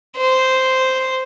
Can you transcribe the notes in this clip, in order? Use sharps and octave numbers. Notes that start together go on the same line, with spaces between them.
C5